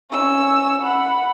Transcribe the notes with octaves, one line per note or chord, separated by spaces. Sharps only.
C#4 E6
F#5 B5